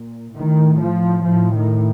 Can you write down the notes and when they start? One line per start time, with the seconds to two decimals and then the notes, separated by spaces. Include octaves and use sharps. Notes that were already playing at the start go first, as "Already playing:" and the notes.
Already playing: A#2
0.36 A2 D#3
0.80 F3
1.25 A2 F3
1.54 D#3